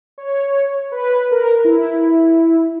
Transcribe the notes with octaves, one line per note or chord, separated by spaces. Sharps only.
C#5
B4
A#4
E4